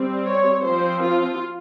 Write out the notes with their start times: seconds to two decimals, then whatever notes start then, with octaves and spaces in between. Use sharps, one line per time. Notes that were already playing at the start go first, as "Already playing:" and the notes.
Already playing: G3 C4
0.26 C#5
0.64 F3 C4 C5
1.03 F4